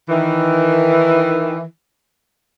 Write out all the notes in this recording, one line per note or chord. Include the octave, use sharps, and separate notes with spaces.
D#3 E3